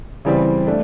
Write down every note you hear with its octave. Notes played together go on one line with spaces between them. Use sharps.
C#3 E3 G3 C4
A3 D4